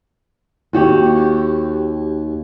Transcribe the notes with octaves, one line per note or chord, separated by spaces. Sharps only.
D#2 F#4 G4